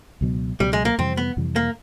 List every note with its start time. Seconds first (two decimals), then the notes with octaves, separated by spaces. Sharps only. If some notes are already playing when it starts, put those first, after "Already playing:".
0.21 C#2 B2 F#3 B3
0.60 C#2 B2 F#3 G3 B3
0.73 G#3
0.85 A#3
0.98 F2 C3 E3 G3 C4
1.17 B3
1.37 F2 C3 E3 G3
1.56 A#3